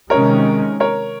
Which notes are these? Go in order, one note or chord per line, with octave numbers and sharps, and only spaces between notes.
C3 D#3 G#3 C#4 A#4 C#5
A#4 C#5